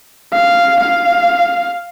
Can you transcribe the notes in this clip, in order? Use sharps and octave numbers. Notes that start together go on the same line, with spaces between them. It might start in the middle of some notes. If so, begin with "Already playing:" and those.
F5
F5